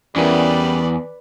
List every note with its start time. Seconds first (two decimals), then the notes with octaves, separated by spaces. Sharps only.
0.16 E2 G3 C#4 E4 A#4 B4 D5